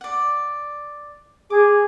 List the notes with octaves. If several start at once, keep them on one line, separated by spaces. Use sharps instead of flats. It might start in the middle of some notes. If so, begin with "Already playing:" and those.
D5 F#5
G#4 D6